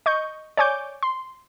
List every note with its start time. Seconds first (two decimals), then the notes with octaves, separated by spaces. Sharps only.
0.06 D#5 C#6 G6
0.57 C#5 D5 G#5 D6 G6
1.03 C6